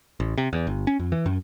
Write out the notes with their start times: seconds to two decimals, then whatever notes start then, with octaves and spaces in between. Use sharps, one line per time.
0.20 A1
0.38 C3
0.53 E2
0.67 G1
0.87 C#4
0.99 F2
1.12 E3
1.26 F#2